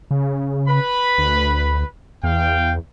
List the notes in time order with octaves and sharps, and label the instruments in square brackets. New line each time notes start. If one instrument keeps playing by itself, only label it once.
[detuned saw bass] C#3
[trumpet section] B4 B5
[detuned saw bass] D2
[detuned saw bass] E2 [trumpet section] F5 G5